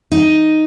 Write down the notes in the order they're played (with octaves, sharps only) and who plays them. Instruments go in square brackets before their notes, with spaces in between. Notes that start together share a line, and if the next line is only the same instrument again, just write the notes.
[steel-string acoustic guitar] D#4